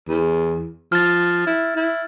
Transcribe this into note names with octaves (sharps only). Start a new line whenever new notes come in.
E2
F3 F6 A6
E4
E4